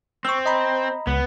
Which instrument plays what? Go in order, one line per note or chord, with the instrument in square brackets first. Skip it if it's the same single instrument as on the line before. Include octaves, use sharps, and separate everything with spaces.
[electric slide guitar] C4 [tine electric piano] C#6 E6
[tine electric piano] D#5 A#5 B5
[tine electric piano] C#2 [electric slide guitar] B3